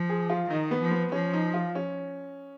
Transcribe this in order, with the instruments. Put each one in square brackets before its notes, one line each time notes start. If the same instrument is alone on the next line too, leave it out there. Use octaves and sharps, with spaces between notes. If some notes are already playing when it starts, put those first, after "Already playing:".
Already playing: [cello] F3
[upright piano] G#4
F4
[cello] D#3 [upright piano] D#4
[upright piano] B3
[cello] F3
[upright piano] B3
[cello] F3 [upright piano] C#4
[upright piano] D#4
F4
C#4